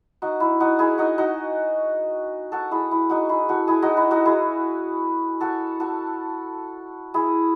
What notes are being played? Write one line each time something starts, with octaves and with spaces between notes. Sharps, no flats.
D#4 F#4
E4
D#4 F#4
E4 G#4
D#4 F#4
D#4 F#4
F#4 A4
E4 G#4
E4
D#4 F#4
E4 G#4
F#4 A4
E4 G#4
D#4 F#4
E4
D#4 F#4
E4 G#4
F#4 A4
F#4 A4
E4 G#4